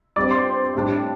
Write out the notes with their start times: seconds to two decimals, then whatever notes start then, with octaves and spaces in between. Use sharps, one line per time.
0.16 G2 G3 C4 D5 D6
0.31 C5 C6
0.75 A2 G3 D4